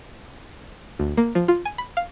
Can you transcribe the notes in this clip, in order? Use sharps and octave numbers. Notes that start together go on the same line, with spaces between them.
D2
A#3
F3
F4
G#5
B5
F5